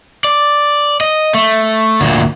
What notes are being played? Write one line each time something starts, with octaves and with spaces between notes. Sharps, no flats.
D5
D#5
A3
D2 A#2